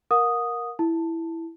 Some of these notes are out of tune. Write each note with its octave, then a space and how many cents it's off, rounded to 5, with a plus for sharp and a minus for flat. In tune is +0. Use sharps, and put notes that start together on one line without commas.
A#4 +5 F#5 -45 D#6 -5
E4 +0 A5 +10